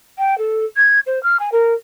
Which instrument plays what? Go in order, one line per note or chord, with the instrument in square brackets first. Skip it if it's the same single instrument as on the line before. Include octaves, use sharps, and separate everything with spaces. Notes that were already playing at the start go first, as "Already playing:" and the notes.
[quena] G5
A4
G#6
C5
F6
G#5
A#4